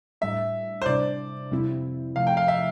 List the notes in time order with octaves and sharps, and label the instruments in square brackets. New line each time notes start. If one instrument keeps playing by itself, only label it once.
[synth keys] A2 G3 D4 [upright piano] E5
[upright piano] C5
[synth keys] C3 G3 D4 [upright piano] D5
[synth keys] F2 C3 G3 C4 E4
[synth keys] C3 F3 A3 [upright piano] F5
[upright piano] G5
F5
E5